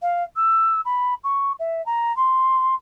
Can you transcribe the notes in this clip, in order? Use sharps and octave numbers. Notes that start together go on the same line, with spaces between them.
F5
E6
B5
C#6
E5
A#5
C6